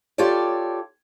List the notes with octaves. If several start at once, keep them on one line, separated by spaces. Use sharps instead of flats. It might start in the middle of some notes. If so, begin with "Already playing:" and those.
F4 G4 A4 C#5 D5